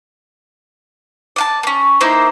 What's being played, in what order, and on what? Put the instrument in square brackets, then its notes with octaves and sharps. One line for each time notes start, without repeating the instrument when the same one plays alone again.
[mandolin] D5 F5 A5
A#3 C#4
A#3 D#4 E4 C5